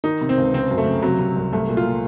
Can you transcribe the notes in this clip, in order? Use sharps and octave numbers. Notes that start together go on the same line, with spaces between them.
D#3 D#4
C3
C4
C#2
C#3 C4
F#2
A3
C#3
C3 F#3
C3
C2
C2 A3
A#2
F4
A#2